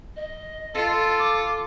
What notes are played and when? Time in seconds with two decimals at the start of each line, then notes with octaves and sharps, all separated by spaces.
0.16 D#5
0.75 F4 A4
1.18 D6